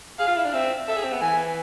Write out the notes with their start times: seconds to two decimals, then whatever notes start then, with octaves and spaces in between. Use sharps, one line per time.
0.19 G#4 F5
0.27 F4
0.36 E4
0.45 D4
0.53 C4 E5
0.88 A4 E5
0.96 G#4
1.04 C4
1.13 B3
1.21 E3 G#5